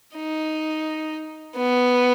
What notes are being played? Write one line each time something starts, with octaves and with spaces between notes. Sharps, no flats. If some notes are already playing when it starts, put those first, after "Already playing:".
D#4
B3